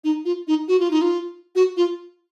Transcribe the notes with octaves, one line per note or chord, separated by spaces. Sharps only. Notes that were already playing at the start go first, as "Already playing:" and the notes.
D#4
F4
D#4
F#4
F4
D#4
F4
F#4
F4